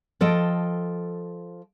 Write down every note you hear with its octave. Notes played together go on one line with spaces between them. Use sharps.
F3 A4 D#5 G5